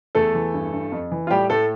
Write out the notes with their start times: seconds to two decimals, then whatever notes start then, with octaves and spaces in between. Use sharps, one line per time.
0.15 E2 A3 A4
0.35 E3
0.54 G2
0.72 G2
0.92 F2
1.12 E3
1.27 F4
1.31 A2 G3 G4
1.50 A2 A3 A4